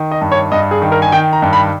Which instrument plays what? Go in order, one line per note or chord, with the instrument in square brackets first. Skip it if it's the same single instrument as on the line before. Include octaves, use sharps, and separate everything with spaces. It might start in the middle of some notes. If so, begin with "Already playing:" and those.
Already playing: [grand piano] D#3
D#5
G2
C#5
G2 D#5
G#4
D#3
A#4
G#5
D#3 G5
A#5
G2
B5